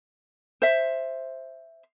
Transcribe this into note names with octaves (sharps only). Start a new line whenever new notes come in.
C5 E5